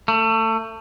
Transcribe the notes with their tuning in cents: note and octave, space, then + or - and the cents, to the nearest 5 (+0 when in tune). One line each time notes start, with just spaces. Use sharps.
A3 +25